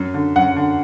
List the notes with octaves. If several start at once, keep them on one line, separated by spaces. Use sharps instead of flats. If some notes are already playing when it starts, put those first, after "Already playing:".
Already playing: F#2
D3
F#2 F#5
D3